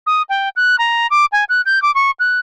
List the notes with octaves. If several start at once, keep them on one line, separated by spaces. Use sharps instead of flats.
D#6
G5
F#6
A#5
D6
G#5
F#6
G6
D6
C#6
F#6